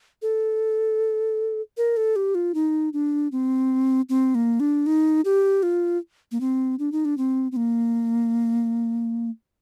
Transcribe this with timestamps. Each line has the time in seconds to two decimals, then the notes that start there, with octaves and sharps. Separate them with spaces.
0.22 A4
1.77 A#4
1.97 A4
2.16 G4
2.35 F4
2.55 D#4
2.93 D4
3.32 C4
4.09 C4
4.35 A#3
4.60 D4
4.86 D#4
5.25 G4
5.63 F4
6.32 A#3
6.41 C4
6.79 D4
6.92 D#4
7.05 D4
7.18 C4
7.52 C4
7.56 A#3